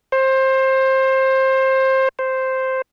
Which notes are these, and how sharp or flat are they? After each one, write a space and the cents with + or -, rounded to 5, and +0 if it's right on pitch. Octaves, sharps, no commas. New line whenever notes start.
C5 +20
C5 +0